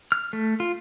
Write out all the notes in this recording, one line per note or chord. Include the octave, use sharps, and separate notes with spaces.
F6
A3
F4